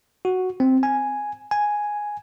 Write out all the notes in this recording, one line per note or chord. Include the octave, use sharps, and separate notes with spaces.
F#4
C4
G#5
G#5